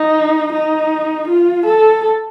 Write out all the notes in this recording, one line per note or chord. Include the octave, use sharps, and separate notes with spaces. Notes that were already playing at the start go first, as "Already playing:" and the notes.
Already playing: D#4
D#4
F4
A4